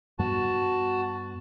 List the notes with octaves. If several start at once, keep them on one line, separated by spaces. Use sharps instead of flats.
G2 G3 B3 F#4 A5